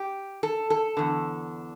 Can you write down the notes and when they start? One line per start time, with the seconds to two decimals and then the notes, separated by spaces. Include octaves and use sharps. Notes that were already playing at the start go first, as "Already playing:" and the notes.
Already playing: G4
0.43 A4
0.70 A4
0.97 E2 D3